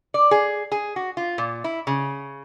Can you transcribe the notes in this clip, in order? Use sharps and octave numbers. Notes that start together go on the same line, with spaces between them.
D5
G#4
G#4
F#4
F4
A#2
E4
C#3